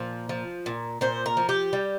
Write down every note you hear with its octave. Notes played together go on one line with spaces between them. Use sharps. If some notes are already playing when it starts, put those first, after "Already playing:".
Already playing: A#2 F3
F3
A#2
A#2 C5
A#4
F3
G4
G3